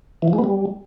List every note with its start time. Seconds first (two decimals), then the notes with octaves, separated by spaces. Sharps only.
0.22 E3
0.28 F3
0.33 G#3
0.38 B3
0.44 G3